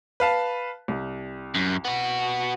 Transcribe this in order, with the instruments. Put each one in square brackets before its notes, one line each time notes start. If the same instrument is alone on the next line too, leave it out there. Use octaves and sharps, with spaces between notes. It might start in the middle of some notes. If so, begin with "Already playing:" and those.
[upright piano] B4 F5 A5
C2
[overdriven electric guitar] F#2
B3 F#4